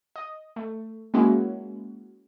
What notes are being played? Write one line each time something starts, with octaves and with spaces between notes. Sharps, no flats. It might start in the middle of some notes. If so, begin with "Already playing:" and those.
D#5
A3
G#3 A#3 C#4 E4 F#4